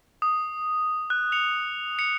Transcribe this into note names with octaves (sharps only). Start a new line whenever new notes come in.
D#6
F#6
C#7 F7
C#7 F7